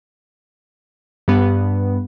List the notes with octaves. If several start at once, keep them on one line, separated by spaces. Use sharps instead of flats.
G2 B3